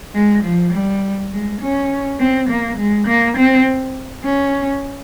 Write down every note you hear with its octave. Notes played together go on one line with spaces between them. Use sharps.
G#3
F3
G3
G#3
C#4
C4
A#3
G#3
A#3
C4
C#4